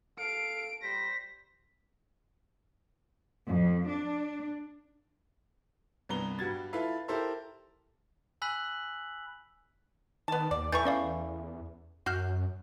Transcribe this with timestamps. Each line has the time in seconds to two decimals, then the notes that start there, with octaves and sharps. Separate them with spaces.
0.19 A4 F5 D7
0.83 G3 C5 A#6 B6
3.47 F2
3.89 D4
6.09 C2 G2 B3 A#5 G7
6.39 G2 G3 F#4 G#6 A6
6.73 E4 F4 A4 B4 E5 F5
7.08 E4 G4 A4 A#4 C5 E5
8.42 G#5 B5 E6 F#6 B6 F#7
10.28 D#3 B3 A5
10.51 D#2 D5
10.72 E2 E3 A3 C#6 G6 A6
10.85 C#4 D5 F5
12.06 F#2 F#4 F6 G6 C7